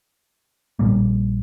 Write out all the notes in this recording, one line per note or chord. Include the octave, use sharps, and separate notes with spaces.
A#1 A#2 G3 A#3